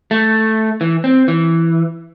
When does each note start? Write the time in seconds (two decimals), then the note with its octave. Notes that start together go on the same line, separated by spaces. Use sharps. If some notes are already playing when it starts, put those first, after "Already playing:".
0.11 A3
0.81 E3
1.04 C4
1.28 E3